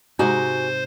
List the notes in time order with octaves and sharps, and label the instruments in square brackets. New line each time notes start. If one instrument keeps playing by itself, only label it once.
[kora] G#2 C3 D#4 [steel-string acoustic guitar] F#4 G#5 [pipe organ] C5